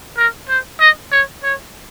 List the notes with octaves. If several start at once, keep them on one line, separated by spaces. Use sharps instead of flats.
A#4
C5
D#5
C#5
C#5